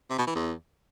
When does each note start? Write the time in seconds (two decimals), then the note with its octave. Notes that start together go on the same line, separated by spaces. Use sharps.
0.10 C3
0.18 B2
0.27 E3
0.35 E2